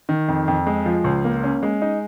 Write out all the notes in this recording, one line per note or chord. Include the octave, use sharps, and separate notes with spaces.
D#3
F2
F2
G#3
F3
C#2
A#3
C#4
G#3
D#4